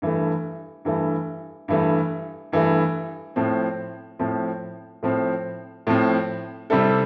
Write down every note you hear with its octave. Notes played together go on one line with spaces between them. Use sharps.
G2 E3 A3
G2 E3 A3
G2 E3 A3
G2 E3 A3
A2 F3 C4
A2 F3 C4
A2 F3 C4
A2 F3 C4
C3 G3 C4 E4 A4